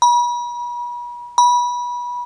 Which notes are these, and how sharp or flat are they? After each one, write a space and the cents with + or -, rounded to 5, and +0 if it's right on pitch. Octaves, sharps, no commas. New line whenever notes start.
B5 -40
B5 -25